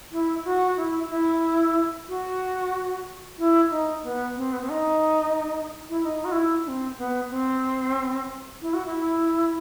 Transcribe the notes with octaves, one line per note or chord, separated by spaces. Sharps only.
E4
F#4
E4
E4
F#4
E4
D#4
B3
C4
B3
C4
D#4
E4
E4
D#4
F#4
E4
D#4
C4
B3
C4
E4
F#4
E4